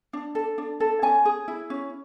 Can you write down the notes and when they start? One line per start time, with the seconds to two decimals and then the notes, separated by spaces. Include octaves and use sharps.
0.13 D4
0.35 A4
0.58 D4
0.80 A4
1.02 C#4 G#5
1.25 G#4
1.48 E4
1.70 C#4